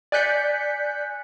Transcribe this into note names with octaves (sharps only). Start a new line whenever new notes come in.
D5 G#5 F#6 G6 B6 C#7